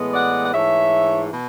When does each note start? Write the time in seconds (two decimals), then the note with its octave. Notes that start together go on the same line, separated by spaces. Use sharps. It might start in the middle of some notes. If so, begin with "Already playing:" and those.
Already playing: A2 E3 G#3 B3
0.14 D5 F#5
0.44 F#5
0.54 G#2 E3 A3 C#5 E5
1.33 B2